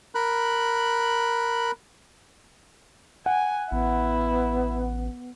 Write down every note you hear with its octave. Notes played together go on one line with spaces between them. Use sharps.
A#4 B5 F#6
F#5 G#5
A1 B3 E4